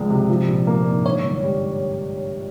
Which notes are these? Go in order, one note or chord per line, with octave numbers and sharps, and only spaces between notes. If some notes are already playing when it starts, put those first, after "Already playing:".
Already playing: C#2 F3 G#3 D5
C3
F3
A#1
A#3
G#2
D3 C#5
G1
G3